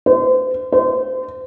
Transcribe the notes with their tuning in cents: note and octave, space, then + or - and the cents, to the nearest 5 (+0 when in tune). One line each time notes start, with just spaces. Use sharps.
C5 -35
C5 -30